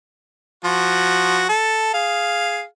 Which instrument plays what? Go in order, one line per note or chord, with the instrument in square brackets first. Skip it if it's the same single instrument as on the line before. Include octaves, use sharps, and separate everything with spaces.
[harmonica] F3 F#4
A4
G#4 F5